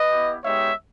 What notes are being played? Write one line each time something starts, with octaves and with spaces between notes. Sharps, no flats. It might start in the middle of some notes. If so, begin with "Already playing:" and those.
Already playing: B4 D#5
B3 E4 G4
G#3 B3 D#4 G4 C#5 E5